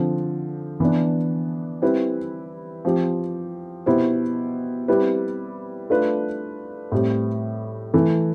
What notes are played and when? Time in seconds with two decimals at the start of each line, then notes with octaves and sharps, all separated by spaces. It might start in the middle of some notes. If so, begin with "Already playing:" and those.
Already playing: D3 F3 C4
0.80 E3 B3 D4
1.82 G3 C4 E4 B4
2.85 F3 C4 G4
3.86 B2 B3 E4 G4 C5
4.88 G3 C4 E4 B4
5.90 A3 D4 F4 B4
6.92 A2 G3 C4
7.94 E3 A3 E4